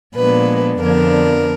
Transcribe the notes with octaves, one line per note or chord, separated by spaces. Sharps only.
A#2 F3 G#3 B3 D4 B4
F2 D3 F3 B3 D4 A#4